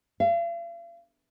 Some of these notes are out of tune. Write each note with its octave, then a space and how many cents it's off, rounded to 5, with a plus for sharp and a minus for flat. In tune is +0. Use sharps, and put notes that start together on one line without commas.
F5 -45